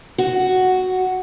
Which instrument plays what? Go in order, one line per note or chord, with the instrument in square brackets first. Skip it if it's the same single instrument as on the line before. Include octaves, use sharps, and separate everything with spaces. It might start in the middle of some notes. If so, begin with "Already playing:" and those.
[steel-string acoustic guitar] F#4